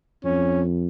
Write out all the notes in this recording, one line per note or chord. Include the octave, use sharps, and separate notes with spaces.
F2 C#4